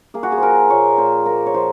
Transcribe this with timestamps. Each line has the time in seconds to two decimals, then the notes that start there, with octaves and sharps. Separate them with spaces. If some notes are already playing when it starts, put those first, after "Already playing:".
0.14 A#3 G#4
0.23 F#4
0.32 G#4
0.38 F3 A#4 C5
0.70 A#2 C#5
0.98 A#2 C5
1.26 A#3 A#4
1.46 C#5
1.54 F3 C5